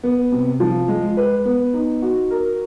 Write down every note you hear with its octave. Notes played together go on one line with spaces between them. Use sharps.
B3
C3
F3
G#3
B4
B3
D#4
F#4
A#4